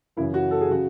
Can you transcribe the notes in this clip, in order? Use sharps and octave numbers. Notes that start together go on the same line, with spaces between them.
F#2 C#3 E3 E4
F#4
A4
G#4
C#3 F#3 F#4